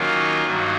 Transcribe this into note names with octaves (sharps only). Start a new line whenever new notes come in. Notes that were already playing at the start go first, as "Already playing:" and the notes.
Already playing: D#3 F#3 A#3 C#4 F4
G2 D#3 F#3 A#3